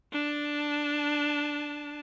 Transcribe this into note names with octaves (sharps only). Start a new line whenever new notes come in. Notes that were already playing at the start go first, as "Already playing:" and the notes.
D4 A5